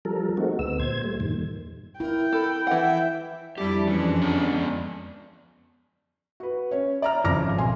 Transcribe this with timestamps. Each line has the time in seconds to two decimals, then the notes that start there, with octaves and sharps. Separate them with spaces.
0.05 F3 G3 A4 A#4
0.37 G#3 A3 C4 D#4 F#4
0.59 D2 B3 E6
0.79 A#2 C5 G#6
1.04 G3 A3
1.20 E2 G2 A#2 D#3
2.00 E4 A#4 G5
2.32 A4 B5
2.67 E3 E5 F#5
3.58 F2 G3 D4 E4 G4
3.88 E3 G#3 C#4
4.22 D3 B3 D5
6.40 F#4 B4
6.71 C#4 C#5
7.02 D5 A#5 F6
7.24 G#1 F2 C#3 D6 F6 A#6
7.56 E1 B1 G#5 C6